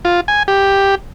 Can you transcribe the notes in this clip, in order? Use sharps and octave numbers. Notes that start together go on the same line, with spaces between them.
F4
G#5
G4